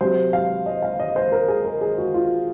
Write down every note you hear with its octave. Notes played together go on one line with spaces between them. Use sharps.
C3 F#3 C5
F5
D#5
F5
D#5
C5
A#4
G#4
A#4
G#4
F#4
F4